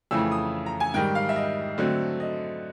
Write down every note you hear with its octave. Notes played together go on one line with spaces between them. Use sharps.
F2 C#3 E3 A3 E6
D#6
A#5
G#5
G#2 D#3 G3 G5
F5
E5
D#5
D3 F#3 A3 C4
D#5